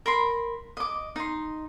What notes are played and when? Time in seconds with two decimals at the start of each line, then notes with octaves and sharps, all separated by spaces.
0.06 A#4 B5 C6
0.77 D#5 D6
1.16 D#4 C6